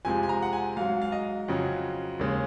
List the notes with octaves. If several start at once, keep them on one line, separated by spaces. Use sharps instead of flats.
F2 C3 F3 G#3 G#5
G#5
A#5
F#5
G#5
G#2 F#3 F5
F5
D#5
F2 C#3 F#3
D#2 C#3 G#3